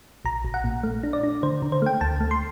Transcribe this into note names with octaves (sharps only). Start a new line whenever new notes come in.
A#1 A#5
A#1
F#5
A#2
A3
D4
D5
D4
D3 C5
D3
C5
A3 G5
D2 A5
A3
C6